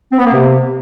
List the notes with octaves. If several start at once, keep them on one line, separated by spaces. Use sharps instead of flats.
C4
B3
A#3
C3